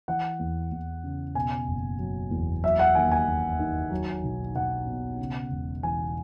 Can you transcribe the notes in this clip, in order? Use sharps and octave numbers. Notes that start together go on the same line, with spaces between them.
E3 F#5
E2
E2
C#3
B2 G#5
F#1
F#3
E2
F#3 E5
F#5
D#2 G#5
G#5
D#2
D#3
F#3
B1
B1 F#5
B2
C#3
E1
E3 G#5